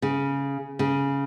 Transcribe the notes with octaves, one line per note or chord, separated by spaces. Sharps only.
C#3
C#3